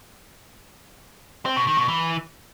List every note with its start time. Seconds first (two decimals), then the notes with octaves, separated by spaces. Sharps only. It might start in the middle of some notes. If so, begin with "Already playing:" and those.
1.46 C4
1.56 B2
1.67 D#3
1.78 B2
1.88 E3